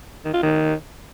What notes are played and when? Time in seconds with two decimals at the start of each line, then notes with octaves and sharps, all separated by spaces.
0.25 D#3
0.34 F4
0.43 D#3